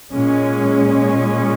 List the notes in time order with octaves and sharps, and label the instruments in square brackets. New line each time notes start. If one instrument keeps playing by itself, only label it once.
[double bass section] A#2 G#3 C#4